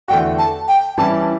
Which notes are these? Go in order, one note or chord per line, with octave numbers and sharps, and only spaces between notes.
E2 D3 A3 D4 F#4 G5
A5
G5
E3 G3 C#4 E4 A5